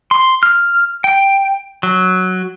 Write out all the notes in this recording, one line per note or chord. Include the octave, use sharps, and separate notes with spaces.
C6
F6
G5
F#3